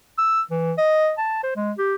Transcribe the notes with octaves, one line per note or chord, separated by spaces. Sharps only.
E6
E3
D#5
A5
C5
G#3
G4